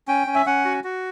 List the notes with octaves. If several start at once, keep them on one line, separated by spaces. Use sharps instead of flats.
C#4 G5
C#4
E5
C#4 F#5
F#4
F#4